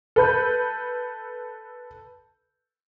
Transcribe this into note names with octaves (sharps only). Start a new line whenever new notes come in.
A4 B4 G6